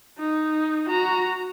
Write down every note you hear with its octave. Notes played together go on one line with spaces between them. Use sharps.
D#4
F#4 A#5